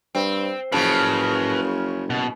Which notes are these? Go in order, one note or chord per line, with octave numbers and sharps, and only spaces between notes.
G2 C4
F#1 C#3 F3 B4 A5
B2